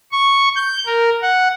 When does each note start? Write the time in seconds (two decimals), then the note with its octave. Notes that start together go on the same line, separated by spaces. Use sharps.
0.12 C#6
0.56 G6
0.86 A#4
1.22 F#5